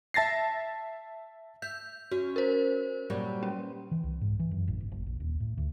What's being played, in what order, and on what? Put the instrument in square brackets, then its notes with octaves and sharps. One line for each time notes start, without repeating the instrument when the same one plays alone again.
[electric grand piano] E5 A5 A6 A#6 C7
[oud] E5 [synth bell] G6
[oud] C#4 [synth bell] F#4
[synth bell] A#4 C5
[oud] A#2 F#3 G3
[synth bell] C#4
[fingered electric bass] E3
C2
G#2
E3
F#2
A1
G1
F#1
A#1
D#1
A2
D2